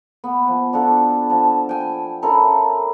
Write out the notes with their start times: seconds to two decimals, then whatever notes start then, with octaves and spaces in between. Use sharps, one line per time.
0.24 B3
0.48 F3
0.73 D4 F4 F#4 A4
1.30 F3 A5
1.69 G5 G#5
2.22 C#4 E4 A4 A#4